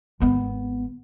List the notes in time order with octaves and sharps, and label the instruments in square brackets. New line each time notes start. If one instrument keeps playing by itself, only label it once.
[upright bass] G#1 B3